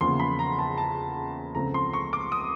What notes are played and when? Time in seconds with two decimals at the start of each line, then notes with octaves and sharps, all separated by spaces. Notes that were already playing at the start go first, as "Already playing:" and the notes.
0.01 E2 C#3 F3 A#3 C6
0.20 B5
0.39 A#5
0.59 A5
0.78 A5
1.55 C#2 C#3 F3 A3 C4 A#5
1.74 C6
1.93 C#6
2.13 D6
2.32 D#6